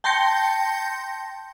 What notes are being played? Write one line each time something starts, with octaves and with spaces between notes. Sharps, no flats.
G5 A5 C6 G6 A#6 C#7